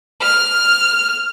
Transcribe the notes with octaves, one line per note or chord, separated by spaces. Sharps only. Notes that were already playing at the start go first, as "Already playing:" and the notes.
F6